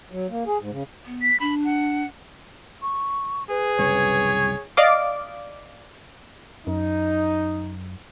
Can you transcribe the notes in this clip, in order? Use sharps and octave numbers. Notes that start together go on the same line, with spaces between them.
F#3
A#3
G#4
G#2
C#3
B3
B6
D4 B5
F#5
C#6
G#4 B4
C2 F#2 C#3 C#5
D5 D#5 F5 D6
F#2 D#4